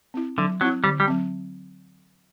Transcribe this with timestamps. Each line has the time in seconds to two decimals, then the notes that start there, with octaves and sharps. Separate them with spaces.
0.14 C4 E4
0.38 D3 F#3
0.61 F#3 C4 E4
0.84 D3 G3
1.00 G3
1.08 F#3 C4